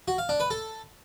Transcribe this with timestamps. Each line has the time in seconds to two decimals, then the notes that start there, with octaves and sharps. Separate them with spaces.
0.08 F#4
0.18 F5
0.29 D4
0.40 B4
0.50 A4